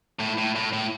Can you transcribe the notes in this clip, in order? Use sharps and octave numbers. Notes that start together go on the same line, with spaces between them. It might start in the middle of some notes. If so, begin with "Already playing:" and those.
A2
A2
A2
A2